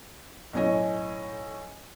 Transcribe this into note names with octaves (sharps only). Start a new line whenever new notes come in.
B1 A2 C#4 C#5 D#5 G#5